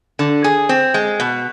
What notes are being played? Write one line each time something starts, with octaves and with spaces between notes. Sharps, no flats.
D3
G#4
C4
G#3
B2